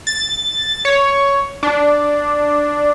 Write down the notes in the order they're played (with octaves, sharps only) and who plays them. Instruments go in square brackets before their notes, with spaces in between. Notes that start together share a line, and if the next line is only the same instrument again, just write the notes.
[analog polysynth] A6
C#5
D4